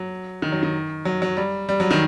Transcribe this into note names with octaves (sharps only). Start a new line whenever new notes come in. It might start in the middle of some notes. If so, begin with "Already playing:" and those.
Already playing: F#3
D#3
F#3
D#3
F#3
F#3
G3
G3
F#3
D#3